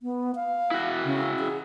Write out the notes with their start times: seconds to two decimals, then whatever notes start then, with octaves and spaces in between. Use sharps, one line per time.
0.03 B3
0.35 F5
0.71 E4 F#4
1.04 C#3
1.39 G#4